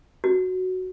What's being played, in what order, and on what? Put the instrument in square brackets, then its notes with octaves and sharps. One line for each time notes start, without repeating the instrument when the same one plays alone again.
[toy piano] F#4